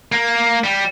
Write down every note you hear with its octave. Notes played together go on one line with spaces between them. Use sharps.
A#3
G3